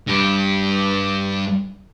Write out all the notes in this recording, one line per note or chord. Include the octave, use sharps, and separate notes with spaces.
G2 G4